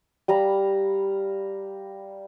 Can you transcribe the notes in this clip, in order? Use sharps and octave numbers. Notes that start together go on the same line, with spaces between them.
G3 F5 A#5 B5